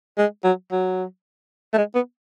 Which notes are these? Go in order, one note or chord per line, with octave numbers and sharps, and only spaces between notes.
G#3
F#3
F#3
A3
G#3
B3